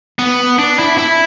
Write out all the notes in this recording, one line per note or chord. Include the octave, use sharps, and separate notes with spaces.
B3
D4
E4
E4